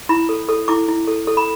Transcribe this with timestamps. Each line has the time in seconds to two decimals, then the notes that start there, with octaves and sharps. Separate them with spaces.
0.09 E4 B5
0.29 A4
0.49 A4
0.68 E4 D6
0.88 E4
1.07 A4
1.27 A4
1.37 B5